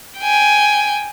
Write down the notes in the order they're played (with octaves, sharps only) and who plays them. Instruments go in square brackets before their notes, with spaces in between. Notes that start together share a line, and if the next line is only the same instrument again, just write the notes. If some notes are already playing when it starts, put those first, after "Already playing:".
[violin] G5 G#5